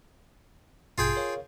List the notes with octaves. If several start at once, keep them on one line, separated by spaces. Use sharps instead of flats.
A1 G2 B2 F4 G#4 G5
A#4 C#5 F5